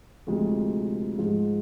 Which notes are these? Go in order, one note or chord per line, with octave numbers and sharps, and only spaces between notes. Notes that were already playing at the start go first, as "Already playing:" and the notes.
D2 C3 F3 G#3
G#2 F3 G#3